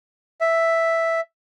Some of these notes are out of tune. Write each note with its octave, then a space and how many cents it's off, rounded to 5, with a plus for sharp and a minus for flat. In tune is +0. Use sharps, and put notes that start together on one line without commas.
E5 +0